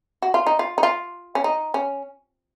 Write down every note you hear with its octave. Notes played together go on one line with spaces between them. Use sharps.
F#4
F4
D#4
F4
D#4
F4
C#4
D#4
C#4